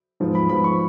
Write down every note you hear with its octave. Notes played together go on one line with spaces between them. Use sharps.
G#2 F3 B3
B5
G#2 F3 B3 B5
C#6